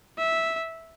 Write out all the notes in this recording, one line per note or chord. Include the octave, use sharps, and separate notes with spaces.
E5